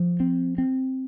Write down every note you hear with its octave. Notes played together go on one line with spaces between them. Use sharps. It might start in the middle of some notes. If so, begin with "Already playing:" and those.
Already playing: F3
C4
C4